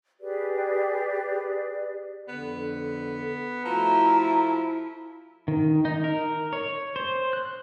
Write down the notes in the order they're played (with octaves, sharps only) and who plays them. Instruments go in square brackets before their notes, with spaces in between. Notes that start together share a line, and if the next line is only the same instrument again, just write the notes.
[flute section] G4 G#4 B4 D5
[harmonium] F2 D3 [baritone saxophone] B3
[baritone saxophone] F3 [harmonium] A3 F#4 A5 [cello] E4 [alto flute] A#5
[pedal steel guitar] D#3
D#4
A#4
C#5
C5
F#6